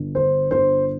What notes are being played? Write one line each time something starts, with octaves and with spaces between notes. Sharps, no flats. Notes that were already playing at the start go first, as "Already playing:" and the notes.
Already playing: G1
D3 C5
G1 C5